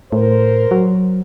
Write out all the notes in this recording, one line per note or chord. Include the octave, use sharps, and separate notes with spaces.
A2 A#4 C5
F#3